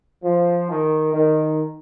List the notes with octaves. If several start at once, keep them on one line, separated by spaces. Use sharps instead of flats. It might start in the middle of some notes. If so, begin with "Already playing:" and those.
F3
D#3
D#3